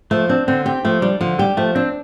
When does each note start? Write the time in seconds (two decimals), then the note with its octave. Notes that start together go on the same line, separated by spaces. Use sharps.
0.11 F3 A3
0.29 C4 D4
0.48 D3 C4
0.66 C4 G4
0.85 F3 A3
1.02 G3 D4
1.21 D3 F3
1.39 G3 G4
1.57 F3 A3
1.75 C4 D4